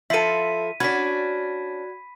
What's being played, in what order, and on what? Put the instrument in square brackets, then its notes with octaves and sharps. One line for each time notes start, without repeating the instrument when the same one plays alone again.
[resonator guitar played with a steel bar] F3 F4 A4 [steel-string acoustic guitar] E4 [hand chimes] E5 [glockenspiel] B6 D#7
[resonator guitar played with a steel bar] C#4 D4 [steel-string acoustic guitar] F#4 D5 [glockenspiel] B5 B6 [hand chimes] G#6